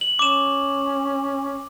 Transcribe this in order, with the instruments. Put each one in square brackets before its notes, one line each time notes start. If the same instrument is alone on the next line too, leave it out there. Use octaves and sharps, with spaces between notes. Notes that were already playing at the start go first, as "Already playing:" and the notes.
[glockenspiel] F#7
[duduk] C#4 [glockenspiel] D6 E7